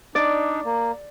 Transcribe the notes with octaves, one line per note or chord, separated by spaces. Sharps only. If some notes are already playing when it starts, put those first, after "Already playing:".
D4 D#4 D5
A#3